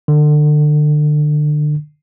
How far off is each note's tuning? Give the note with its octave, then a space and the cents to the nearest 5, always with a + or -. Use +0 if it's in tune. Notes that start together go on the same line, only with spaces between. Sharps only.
D3 +30